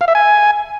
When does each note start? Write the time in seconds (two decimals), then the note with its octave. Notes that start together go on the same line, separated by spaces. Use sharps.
0.01 F5
0.08 E5
0.15 G#5